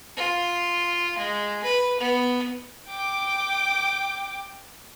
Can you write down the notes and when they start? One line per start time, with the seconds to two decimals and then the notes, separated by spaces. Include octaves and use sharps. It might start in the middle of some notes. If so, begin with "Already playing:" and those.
0.17 F4
1.18 G#3
1.64 B4
1.99 B3
2.89 G5 D6